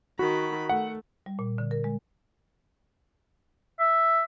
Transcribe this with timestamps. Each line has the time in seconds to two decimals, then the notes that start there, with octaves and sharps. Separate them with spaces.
0.19 D#3 F#4 B5
0.69 A3 F#5
1.26 G3
1.39 A#2
1.58 D3
1.71 A#4
1.84 G#3
3.79 E5